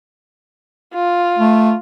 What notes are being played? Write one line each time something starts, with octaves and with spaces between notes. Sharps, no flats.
F4
A3